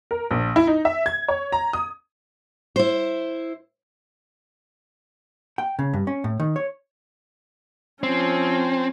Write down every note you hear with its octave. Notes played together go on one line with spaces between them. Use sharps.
A#4
A#1
E4
D#4
E5
G#6
C#5
A#5
D#6
E4 C5
G5
C#3
G2
C#4
A2
D#3
C#5
F3 C4 C#4